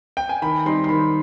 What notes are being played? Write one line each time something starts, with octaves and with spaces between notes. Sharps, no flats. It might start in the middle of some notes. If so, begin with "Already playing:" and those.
G5
G#5
D#3 B5
G3 C4 D#4 C6
C6
D#3 B5